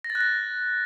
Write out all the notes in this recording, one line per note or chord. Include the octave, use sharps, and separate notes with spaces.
A#6
A6
F#6
A#6